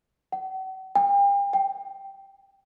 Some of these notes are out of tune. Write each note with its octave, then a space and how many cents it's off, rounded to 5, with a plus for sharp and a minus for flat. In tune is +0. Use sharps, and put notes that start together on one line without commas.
F#5 +40
G5 +40
G5 -5